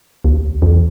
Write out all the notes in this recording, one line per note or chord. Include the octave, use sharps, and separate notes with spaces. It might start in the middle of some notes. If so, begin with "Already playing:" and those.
D2
E2